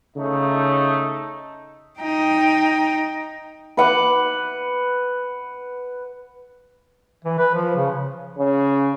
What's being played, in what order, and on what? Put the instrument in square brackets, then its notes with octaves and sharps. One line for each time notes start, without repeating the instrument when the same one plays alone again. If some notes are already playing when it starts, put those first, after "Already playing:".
[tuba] C#3 [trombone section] A3 D#4
[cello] D#4 G5
[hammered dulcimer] B4 F#5 D6
[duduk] E3
B4
F3
C#3
[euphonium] C#3